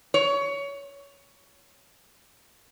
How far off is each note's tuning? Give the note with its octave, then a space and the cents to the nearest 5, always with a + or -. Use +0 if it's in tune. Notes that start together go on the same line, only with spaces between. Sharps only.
C#5 +20